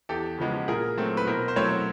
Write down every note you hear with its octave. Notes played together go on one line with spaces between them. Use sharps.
E2 G4 A4
C#3 F3 G#3 B3
A#2 G#4 A#4
F#3 A3 C4
B4
B2 A#4 C5
C5
F#3 A3 C4 B4 C#5